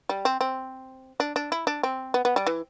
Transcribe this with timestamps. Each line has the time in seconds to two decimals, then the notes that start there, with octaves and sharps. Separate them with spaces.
0.09 G3
0.25 C4
0.41 C4
1.20 D4
1.36 D4
1.52 E4
1.67 D4
1.83 C4
2.14 B3
2.25 B3
2.36 G3
2.46 E3